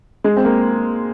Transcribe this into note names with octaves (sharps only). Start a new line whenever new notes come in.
G#3
C4
A#3